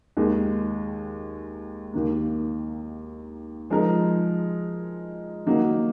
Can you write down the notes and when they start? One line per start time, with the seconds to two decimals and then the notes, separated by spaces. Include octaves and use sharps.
0.17 D#2 D#3 G#3
1.93 D#2 D#3 A#3
3.70 F3 G#3 D#4 A#4
5.46 D#3 F#3 A#3 D#4 F#4